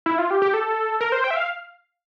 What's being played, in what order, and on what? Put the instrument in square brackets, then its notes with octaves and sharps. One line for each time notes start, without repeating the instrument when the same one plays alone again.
[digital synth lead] E4
F4
G4
G4
A4
A#4
C5
G5
E5
F5